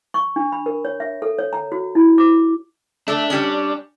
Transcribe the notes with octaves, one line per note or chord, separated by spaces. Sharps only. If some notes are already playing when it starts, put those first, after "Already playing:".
C#6
D4
B5
A#4
C#5
E5
A4
C#5
A#5
F#4
E4
D6
A3 D4
G3 C#4